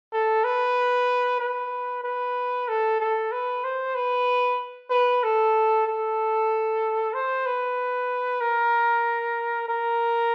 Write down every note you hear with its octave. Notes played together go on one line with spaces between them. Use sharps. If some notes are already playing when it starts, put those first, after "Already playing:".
A4
B4
B4
B4
A4
A4
B4
C5
B4
B4
A4
A4
C5
B4
A#4
A#4